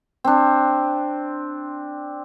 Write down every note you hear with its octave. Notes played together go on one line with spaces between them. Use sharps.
C4 D4